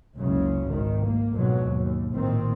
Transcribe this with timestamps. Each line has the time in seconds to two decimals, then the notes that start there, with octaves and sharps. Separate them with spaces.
0.17 F#1 C#2 C#3
0.68 G#1 D#3
1.03 A#3
1.34 F2 G#2 B2 F#3
1.65 D#2
2.12 A#1 A2 D#3 C4